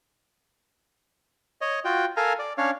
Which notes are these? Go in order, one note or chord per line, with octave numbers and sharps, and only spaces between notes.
C#5 D#5
F4 F#4 G5
A4 A#4 F5 G#5 A#5
D5
C#4 D4 C#5 F5